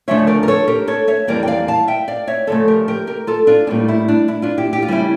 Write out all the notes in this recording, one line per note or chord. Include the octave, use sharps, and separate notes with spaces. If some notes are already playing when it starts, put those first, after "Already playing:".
D2 C#3 F3 A3 D4 C#5 E5
A#4 D5
A#4
A4 C#5
G4 A#4
A4 C#5
C#5 E5
F2 E3 G3 A#3 A#4 D5
G5
D5 F5
F5 A5
E5 G5
D5 F5
C#5 E5
D2 C#3 F3 A3 A4 C#5
G4 A#4
G4 A#4
G4 A#4
F4 A4
D4 F4
A2 G3 A#3 D4 F4
E4
D4
E4
D4 F4
E4 G4
G4
F4
C#3 G3 A#3 C#4 E4